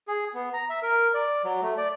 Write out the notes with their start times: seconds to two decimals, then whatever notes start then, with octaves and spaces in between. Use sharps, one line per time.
0.08 G#4
0.34 B3
0.54 A#5
0.70 E5
0.83 A#4
1.14 D5
1.44 F#3
1.63 A3
1.78 D5